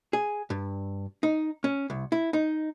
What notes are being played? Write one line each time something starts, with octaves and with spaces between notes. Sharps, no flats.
G#4
G2
D#4
C#4
C2
E4
D#4